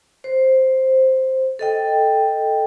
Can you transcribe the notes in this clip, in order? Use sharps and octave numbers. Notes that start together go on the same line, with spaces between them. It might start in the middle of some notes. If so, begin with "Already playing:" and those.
C5
A4 D#5 G5